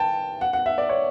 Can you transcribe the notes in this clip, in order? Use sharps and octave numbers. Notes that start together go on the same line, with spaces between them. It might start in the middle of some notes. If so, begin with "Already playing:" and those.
Already playing: G5 A5
F#5
F#5
E5
D5
C#5